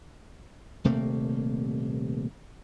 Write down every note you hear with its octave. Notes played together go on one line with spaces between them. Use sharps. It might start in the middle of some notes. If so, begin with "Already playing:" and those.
D#1 C3 A3 A#3